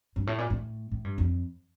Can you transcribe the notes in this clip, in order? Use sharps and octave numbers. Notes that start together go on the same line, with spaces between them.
G2
A2
A#2
A2
A2
G2
F2